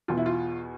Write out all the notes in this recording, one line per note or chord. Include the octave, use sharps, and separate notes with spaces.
E2 B2 F4
E4
F4